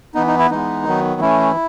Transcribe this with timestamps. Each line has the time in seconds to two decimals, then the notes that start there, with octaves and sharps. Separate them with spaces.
0.15 E3 B3 D#4
0.27 D#4
0.39 E4
0.50 E3 G#3 B3 D#4
0.85 D#3 F#3 B3
1.21 E3 A3 C#4 E4